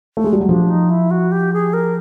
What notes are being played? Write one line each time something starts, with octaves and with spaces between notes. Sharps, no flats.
A3
G#3
G3
F#3
F3 D4
D#4
E4
F#4
G4
G#4
A#4